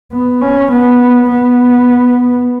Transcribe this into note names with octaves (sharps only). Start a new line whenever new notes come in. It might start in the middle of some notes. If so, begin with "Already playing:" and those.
B3
C#4
B3
B3